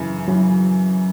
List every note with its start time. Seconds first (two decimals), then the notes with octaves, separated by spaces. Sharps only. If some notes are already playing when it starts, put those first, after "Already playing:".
Already playing: F#2 C#3 E3
0.28 F#2 C#3 E3 F#3